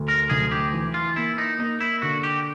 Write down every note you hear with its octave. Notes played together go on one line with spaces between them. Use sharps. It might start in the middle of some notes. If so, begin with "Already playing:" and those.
Already playing: D2
A#4
D2 G#4
G4
E3
F4
A#3 E4
D#4
A#3 D#4
E4
D3 F#4
G4